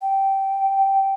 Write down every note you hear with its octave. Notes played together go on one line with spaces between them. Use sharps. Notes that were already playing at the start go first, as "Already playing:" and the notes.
G5